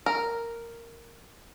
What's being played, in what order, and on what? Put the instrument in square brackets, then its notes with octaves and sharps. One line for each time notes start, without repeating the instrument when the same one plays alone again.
[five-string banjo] A#4